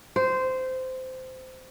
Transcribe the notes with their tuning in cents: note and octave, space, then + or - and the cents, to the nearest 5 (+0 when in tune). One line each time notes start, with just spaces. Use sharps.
C5 -15